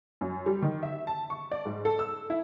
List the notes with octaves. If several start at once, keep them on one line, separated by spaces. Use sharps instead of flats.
F#2
G3
D#3
E5
A5
C#6
D5
G#2
A4
E6
E4